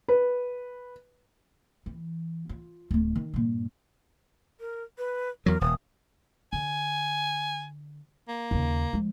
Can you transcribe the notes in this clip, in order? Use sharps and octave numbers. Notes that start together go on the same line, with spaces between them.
B4
E3
F4
D1 A3
D#3
G2 A#2
A#4
B4
E2 F#3 A#4
D#1 D#6
D3 G#5
A#3
D#2 C#3
F3 G#3